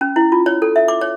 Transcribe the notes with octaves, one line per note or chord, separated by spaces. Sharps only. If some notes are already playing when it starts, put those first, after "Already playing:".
C#4
E4
F4
C#5
A4
E5
D6
C#5